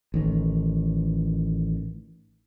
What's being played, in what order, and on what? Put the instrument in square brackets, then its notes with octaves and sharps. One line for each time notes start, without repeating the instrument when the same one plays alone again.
[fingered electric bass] A1 D#3